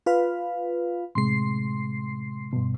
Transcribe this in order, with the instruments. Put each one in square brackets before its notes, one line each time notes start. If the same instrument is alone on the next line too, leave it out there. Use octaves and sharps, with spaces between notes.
[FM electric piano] F4 B4 F5
[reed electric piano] A2 C3 G#3 [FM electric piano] C6 C7
[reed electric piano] G2 B2